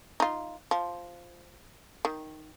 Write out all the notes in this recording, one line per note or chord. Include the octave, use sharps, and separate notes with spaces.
D#4 F4
F3
D#3